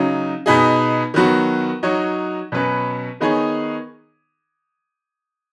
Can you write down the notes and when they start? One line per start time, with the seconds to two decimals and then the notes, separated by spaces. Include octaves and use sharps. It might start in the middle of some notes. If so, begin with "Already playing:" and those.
Already playing: C#3 F#3 D#4
0.46 B2 B3 D#4 G#4
1.14 D#3 F#3 B3 F#4
1.83 F#3 D#4 F#4 C#5
2.52 B2 F#3 C#4 B4
3.20 D#3 B3 D#4 G#4 C#5